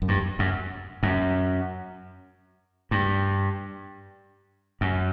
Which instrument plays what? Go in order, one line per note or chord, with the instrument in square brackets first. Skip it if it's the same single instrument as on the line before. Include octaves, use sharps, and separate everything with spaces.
[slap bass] F#2
G2
F#2
F#2
G2
F#2